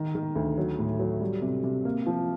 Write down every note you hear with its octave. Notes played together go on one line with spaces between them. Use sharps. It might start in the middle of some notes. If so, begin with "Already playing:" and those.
Already playing: D#3
D#3
D2
F#3
A2
F#3
G3
C3
C3
A#3
F3